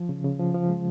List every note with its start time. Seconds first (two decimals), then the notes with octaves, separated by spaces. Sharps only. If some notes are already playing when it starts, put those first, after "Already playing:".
Already playing: F3
0.09 C#3
0.24 C#3
0.40 F3
0.54 F3
0.69 G#3